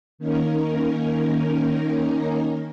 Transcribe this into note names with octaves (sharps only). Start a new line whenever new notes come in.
D#3 A#3 C#4 D#4 A#4